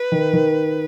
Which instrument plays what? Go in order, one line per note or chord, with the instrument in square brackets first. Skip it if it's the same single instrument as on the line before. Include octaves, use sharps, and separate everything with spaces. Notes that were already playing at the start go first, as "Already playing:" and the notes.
Already playing: [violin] B4
[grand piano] D#3
D#3